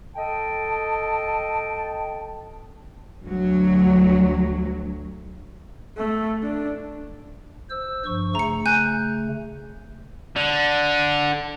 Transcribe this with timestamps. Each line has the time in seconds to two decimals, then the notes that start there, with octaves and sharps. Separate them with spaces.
0.16 A4 D#5 G5 A5
3.23 D2 F#3
5.98 A3
6.43 D4
7.70 C5 E6
8.06 G2 F3 C#6
8.35 C#3 A3 A#5 C#7
8.66 G#5 F#6 G6
10.36 D3